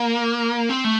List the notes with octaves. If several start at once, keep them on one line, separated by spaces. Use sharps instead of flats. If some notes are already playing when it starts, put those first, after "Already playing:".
Already playing: A#3
C4
A3